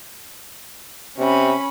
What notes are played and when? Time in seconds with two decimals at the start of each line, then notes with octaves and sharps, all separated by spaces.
1.18 C3 C#4 B5